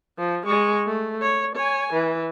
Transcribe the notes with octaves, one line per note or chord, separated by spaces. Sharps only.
F3
G#3 C#6
A3
C#5
C#5 G#5
E3